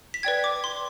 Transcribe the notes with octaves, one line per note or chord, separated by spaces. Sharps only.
B6
B4 D5 G5 G#6
D6
C6